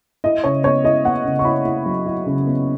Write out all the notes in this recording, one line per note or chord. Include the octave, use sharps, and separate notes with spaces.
E4 D#5
C#3 C#5
B3 C#5
E4 D#5
B3 F#5
C#3
C#6
E4 B5
E4
F#3
E4
C#3
B3